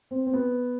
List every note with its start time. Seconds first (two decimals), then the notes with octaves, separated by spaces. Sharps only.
0.11 C4
0.27 C4
0.33 B3